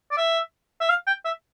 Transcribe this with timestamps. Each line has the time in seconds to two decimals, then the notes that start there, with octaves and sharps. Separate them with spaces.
0.11 D5
0.17 E5
0.81 E5
0.89 F5
1.07 G5
1.25 E5